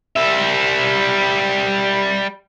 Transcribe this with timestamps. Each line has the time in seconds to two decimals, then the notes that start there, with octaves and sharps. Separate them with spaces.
0.16 G3 E5